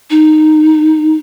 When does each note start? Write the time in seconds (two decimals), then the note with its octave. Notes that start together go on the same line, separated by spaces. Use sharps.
0.11 D#4